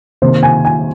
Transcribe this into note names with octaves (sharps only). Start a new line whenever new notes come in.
C3 D#3 A#3 C5
G#5
G#5